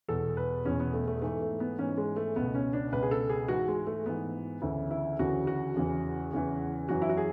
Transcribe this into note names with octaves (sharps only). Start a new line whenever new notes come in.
E2 B2 A4
B4
E2 B2 C#4
B3
A3
A3
G#2 E3 A3
A3
B3
G#2 E3 C#4
G#3
A3
C#2 B2 B3
C#4
D4
C#2 B2 B4
G#4
A4
G#4
G#2 E3 F#4
G#3
A3
G#2 E3 B3
D2 C#3 E3 E4
E4
D2 C#3 E3 F#4
F#4
E2 C#3 E3
E2 C#3 E3
F#2 E3 F#4
E4
F#4
G#4